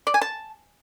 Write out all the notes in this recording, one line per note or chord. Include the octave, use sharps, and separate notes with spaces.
D5
G#5
A5